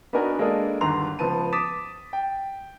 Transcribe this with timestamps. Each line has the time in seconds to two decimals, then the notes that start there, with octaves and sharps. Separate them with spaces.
0.13 B3 D4 D#4 F#4 A#4 G#5
0.39 G#3 A#3 D4 A4 A#4 D#5
0.81 G1 D#2 A#5 C6 F7
1.19 C#2 F3 B3 A5 D#7
1.53 D6 D#6 A6 B6 E7
2.13 G5